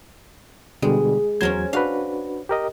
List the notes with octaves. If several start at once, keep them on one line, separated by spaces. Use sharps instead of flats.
B2 D3 G3 G#3
E2 F#3 C#4 A#4 C5 G#6
D4 F#4 B4 F5
G4 A#4 D#5